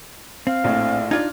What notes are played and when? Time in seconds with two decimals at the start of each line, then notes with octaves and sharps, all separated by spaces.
0.47 C4 F5
0.64 A#1 A2
1.11 D4 D#4 F4 D5 F6 G#6